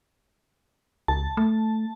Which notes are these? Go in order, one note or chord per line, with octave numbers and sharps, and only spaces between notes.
C#2 A5
A3